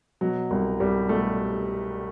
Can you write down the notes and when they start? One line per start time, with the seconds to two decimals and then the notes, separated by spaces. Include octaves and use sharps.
0.21 B2 F#3
0.51 C2
0.80 C2 G3
1.09 B2 A3